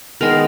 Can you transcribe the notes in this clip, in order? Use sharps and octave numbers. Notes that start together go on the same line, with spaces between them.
D#3 G#3 B3 A#4